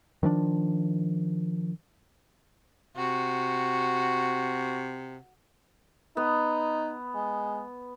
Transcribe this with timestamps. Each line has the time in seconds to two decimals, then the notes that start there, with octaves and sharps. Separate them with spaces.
0.23 D#3 F3 A3 D4
2.97 C3 F#4
6.17 B3 D#4
7.15 G#3